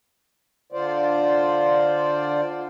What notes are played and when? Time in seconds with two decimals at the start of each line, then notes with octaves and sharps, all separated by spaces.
0.72 D3 F4 C5 D5